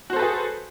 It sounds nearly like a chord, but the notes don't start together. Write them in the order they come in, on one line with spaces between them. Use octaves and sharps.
F#4 C5 A4 B4 G#4